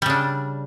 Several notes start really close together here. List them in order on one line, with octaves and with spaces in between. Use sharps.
G3 C#3 D4